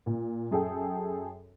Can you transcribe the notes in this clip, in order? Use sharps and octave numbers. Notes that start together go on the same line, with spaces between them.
A#2
F#2 G#4 A4 G5